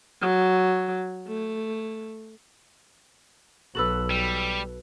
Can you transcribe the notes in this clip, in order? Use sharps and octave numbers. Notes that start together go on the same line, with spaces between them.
F#3
A3
B1 F#4 A4 B4 E6 F#7
G3